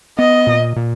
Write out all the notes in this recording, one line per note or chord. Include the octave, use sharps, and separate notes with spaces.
B3 D#5
A#2
A#2